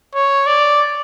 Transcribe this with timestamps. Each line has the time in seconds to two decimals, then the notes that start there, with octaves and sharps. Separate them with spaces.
0.15 C#5
0.47 D5